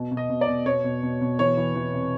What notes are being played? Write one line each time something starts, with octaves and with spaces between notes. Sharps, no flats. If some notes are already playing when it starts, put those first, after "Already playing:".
Already playing: B2
B2
D#5
B2
D5
B2
B2 C#5
B2
B2
B2
E3 C#5
E3
E3
C3